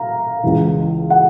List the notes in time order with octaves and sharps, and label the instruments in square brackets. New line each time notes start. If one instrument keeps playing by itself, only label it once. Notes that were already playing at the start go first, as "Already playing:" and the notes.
Already playing: [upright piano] F5 A#5
C#2 C#3 E3
F#5